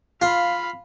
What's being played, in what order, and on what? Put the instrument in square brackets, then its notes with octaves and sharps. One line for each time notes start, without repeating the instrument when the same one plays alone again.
[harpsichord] F4 [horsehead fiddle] F5 B5